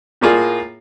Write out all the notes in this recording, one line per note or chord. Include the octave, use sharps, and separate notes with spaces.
A2 A#3 F4 G#4